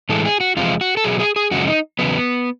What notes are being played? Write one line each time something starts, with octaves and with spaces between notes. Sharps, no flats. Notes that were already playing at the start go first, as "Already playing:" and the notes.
A2 E3 G#3 A4
G#4
F#4
E2 C3 F3 G#3 F4
F#4
A4
B2 F#3 G#4
G#4
G#4
F#2 C#3 F3 G#3 F#4
D#4
E2 C#3 F#3 B3